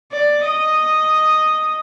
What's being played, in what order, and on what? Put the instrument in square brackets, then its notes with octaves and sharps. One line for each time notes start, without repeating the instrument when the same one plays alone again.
[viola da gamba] D5
D#5